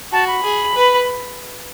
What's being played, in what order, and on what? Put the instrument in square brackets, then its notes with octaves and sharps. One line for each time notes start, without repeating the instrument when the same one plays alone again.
[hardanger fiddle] F#4 [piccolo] A5
[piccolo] B5
[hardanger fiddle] G#4
B4